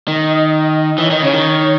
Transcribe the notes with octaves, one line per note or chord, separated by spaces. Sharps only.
D#3 D#5
E3 C#5
D#3 D#5
C#3 C#5
D#3